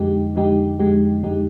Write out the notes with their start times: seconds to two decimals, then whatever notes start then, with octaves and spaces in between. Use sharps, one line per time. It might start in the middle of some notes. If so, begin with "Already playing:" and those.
Already playing: F2 D3 G#3 D#4 G4
0.35 F2 D3 G#3 D#4 G4
0.79 F2 D3 G#3 D#4 G4
1.23 F2 D3 G#3 D#4 G4